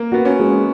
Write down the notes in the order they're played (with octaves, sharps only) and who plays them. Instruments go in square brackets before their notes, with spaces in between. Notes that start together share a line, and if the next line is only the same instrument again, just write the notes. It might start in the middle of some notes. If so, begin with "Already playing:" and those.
Already playing: [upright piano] A#3
[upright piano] B3 [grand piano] F#4
[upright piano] C#4
[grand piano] G#3